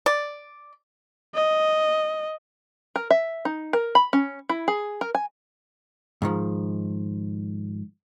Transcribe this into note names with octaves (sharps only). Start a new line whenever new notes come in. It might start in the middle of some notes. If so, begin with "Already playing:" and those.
D5
D#5
A#4
E5
D#4
A#4
B5
C#4
E4
G#4
A#4
G#5
G#2 D#3 F3